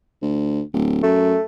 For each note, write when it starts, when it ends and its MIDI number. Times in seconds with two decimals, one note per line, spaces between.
0.22 0.62 38
0.74 0.99 26
1.03 1.36 42
1.03 1.43 57